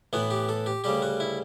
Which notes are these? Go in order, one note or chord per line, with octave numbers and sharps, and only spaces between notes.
A2 E3 B3 F#4
G4
A4
G4
D2 C#3 G3 G4
F#4
E4